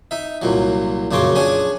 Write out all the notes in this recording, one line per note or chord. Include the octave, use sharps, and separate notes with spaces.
D#4 E5
C2 A#2 F#3
A#1 F#2 C#3 C#5 C6 D6
C#4 D4 G#4 G#5